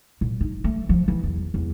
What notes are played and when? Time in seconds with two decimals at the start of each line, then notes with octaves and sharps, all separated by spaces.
0.21 A#2
0.41 D#4
0.64 A3
0.89 F3
1.08 E3
1.23 E2
1.54 E2